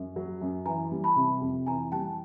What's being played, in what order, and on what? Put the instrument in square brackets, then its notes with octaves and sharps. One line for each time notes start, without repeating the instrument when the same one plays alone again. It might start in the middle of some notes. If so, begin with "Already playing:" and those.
Already playing: [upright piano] F#2
F#3
F#2
[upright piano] E3 [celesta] G#5 A#5
[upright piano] G3
[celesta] A5 B5
[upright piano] C3
F2
[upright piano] E3 [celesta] G#5 A#5
[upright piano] G3 [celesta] G5 A5